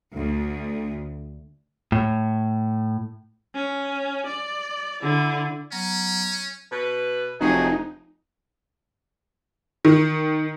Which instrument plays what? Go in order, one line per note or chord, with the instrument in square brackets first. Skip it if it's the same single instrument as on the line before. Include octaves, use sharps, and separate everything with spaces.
[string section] D2
[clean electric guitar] A2
[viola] C#4
D5
D3 E4
[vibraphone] F#3 B3 A#5 [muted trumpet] C#4
[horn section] B2 B4
[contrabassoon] F1 [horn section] F#3 F#4 G#4 [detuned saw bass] D#4
[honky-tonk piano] D#3